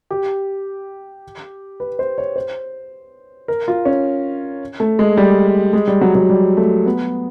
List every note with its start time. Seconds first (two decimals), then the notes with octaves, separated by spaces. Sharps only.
0.11 G4
1.80 B4
1.99 C5
2.18 C#5
2.36 C5
3.48 A#4
3.68 F4
3.85 C#4
4.80 A3
4.99 G#3
5.17 G3
5.73 G#3
5.87 G3
6.01 F#3
6.15 F#3
6.29 G3
6.57 A3
6.86 B3